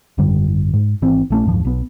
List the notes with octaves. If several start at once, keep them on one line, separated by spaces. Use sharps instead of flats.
G#1 F#2 D3 G3
G#2
G#1 E3 C4
A#1 A3 C#4
F#1 D#2 G#2 F3
B1 B3